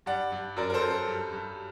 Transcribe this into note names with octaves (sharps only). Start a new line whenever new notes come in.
G2 D5 F#5
G2
F#2 A#4 D5
A#4
A4 C5
F#2
A4
G2
G2